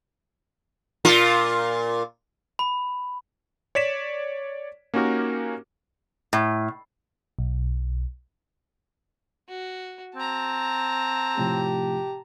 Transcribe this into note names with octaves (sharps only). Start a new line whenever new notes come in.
A#2 F4 A#4
B5
C#5 D5 B6 E7
A#3 C#4 D#4 F#4 G4 A#4
A2
B1
F#4
C4 A5 A#5
A2 C3 F3 G4